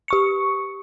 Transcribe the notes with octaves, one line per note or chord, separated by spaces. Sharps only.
G4 C#6 C#7